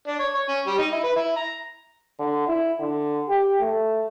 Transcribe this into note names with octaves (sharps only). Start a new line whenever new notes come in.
D4
C#5
C#5
C#4
G3
D#4
E4
B4
E4
A#5
D3
E4
D3
G4
A3